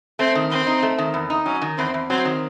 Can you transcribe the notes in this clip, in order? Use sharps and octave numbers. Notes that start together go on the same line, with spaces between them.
A3 C4
D#3
E2 C4
D#4
A3
D#3
E2
D#4
F#3 C#4
D#3
E2 C4
E2
F#3 C4
D#3